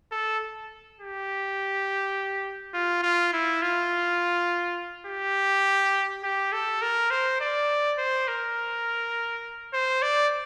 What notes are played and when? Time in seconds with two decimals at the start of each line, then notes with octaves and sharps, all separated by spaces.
0.12 A4
1.00 G4
2.74 F4
3.03 F4
3.33 E4
3.62 F4
5.07 G4
6.24 G4
6.53 A4
6.82 A#4
7.11 C5
7.41 D5
7.98 C5
8.28 A#4
9.74 C5
10.02 D5